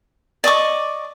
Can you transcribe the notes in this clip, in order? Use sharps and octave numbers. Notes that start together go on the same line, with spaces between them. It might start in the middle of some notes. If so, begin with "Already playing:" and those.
D5 D#5 C#6 D6